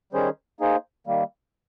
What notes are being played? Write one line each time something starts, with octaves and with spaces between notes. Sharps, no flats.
D#3 G3 C#4 G#4 C5
A#3 D#4 G#4 C5
D#3 G3 A#3